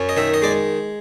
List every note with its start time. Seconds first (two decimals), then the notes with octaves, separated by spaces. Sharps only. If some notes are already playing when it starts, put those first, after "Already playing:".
Already playing: F#2 C#4
0.09 D#5
0.17 D#3 E5
0.34 D#5
0.42 G#3 D5